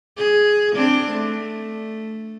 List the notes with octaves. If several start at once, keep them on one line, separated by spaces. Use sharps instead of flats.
G#4
C4 D4
A3